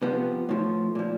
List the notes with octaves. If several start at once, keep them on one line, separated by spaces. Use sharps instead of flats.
C3 F3 B3
A2 F3
A#2 F3